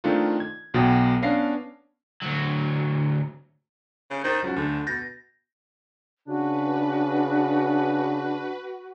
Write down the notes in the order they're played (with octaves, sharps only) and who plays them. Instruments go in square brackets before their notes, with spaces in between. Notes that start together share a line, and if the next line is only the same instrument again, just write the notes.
[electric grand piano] D#3 A3 C4 D4 D#4 F4
G#6
B1 B2 F#3 B3 G5 A6
B3 C#4 D4 F5 A#6 C7
[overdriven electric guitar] D2 F#3
[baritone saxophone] C#3
[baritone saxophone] D#3 [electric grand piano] C5 G6 A6
[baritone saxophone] C#2 [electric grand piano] F#3 C#4 F#4
[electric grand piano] D2 [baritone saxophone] D3
[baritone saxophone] B2 [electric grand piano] G6 A6 A#6
[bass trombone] C#3 [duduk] D4 [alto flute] F#4 [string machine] B4